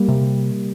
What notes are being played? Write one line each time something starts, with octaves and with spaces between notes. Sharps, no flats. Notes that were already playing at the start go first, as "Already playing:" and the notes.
Already playing: G3 A#3
C3